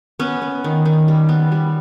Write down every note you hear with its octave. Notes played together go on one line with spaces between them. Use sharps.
B3 C#4
B3
D#3
D#3
G3
B3
G3